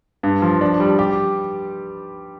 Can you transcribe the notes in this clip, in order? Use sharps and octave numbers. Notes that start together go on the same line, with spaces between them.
G2
F3
D4
G3
G4